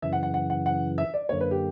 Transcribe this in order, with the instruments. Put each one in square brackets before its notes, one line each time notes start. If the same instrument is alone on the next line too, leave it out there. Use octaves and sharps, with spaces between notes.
[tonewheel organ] F#2 C#3 E3 [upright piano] E5
[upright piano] F#5
F#5
F#5
F#5
F#5
E5
D5
[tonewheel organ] F#2 D3 A#3 [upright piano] C#5
[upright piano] B4
G4